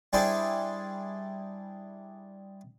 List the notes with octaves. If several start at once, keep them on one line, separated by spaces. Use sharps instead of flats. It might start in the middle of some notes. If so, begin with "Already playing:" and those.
G3 D4 E4 G#4 C5 D5